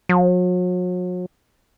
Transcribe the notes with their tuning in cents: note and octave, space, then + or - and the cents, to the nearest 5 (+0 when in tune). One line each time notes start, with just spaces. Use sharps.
F#3 -40